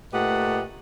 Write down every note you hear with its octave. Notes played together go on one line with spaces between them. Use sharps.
A#2 A3 G4 B4 D#5 F#5